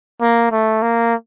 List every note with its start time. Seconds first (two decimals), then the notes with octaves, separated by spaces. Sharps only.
0.21 A#3
0.52 A3
0.82 A#3